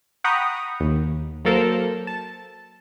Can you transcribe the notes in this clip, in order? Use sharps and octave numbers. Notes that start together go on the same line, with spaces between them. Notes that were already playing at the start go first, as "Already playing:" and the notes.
F#5 G5 A#5 B5 C#6 D#6
D#2
F#3 A#3 A4 A#4 C5
A5